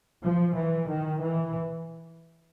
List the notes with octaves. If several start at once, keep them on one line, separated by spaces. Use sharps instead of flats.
F3
E3
D#3
E3